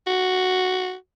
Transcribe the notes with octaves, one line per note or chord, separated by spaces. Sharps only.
F#4